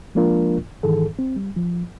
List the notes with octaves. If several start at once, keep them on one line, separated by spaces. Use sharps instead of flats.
F3 G#3 A#3 D4 F4 A#4
G#2 D#3 E3 G#4 A4
C4
G3
F3